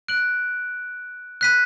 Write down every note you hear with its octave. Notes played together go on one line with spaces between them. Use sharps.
F#6 D7 F#7
F#6 B6 D#7